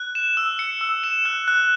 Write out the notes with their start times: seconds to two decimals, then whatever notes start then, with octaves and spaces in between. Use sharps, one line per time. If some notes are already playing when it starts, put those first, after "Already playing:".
Already playing: F#6
0.15 E7
0.37 E6
0.59 C#7
0.81 E6
1.04 E7
1.25 F#6
1.48 F#6